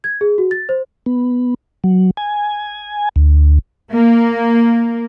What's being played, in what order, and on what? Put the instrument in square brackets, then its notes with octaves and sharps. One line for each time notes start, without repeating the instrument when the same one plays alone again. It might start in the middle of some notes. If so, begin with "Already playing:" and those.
[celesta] G#6
G#4
F#4
A6
C5
[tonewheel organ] B3
F#3
G#5
D2
[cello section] A#3